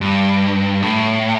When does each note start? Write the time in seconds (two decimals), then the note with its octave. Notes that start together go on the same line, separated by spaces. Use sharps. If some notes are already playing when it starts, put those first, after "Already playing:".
0.01 G2
0.82 A2